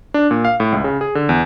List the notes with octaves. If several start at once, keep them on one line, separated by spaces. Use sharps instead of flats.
D4
A#2
F5
A2
C#2
C#3
G#4
D3
E2